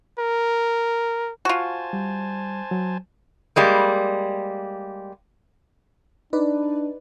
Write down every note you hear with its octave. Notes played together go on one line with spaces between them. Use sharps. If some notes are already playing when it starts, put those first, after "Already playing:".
A#4
F4 F#4 C5 G#5 A5
G3
F#3
G3 G#3 A#3
D4 D#4 B4 D5